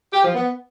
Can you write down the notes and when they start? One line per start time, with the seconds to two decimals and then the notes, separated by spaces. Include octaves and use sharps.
0.12 G4
0.23 F3
0.34 B3